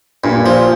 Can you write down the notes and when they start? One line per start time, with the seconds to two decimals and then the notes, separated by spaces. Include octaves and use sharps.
0.24 G2 A#2
0.46 F3